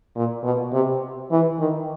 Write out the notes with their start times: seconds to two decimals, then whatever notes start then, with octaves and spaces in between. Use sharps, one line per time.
0.16 A#2
0.44 B2
0.73 C3
1.31 E3
1.59 D#3